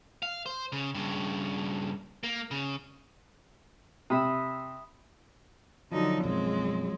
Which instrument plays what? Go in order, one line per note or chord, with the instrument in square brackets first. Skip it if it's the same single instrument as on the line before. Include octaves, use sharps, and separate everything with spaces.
[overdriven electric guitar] F5
C5
C#3
G2 C#3
A#3
C#3
[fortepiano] C3 [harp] E5 B5 D#6
[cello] D3 D#4 [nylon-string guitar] F3 F#3
[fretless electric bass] B1 F#2 [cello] G#3 C4